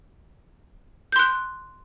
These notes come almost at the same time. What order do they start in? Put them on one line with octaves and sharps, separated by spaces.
G6 C6 F#6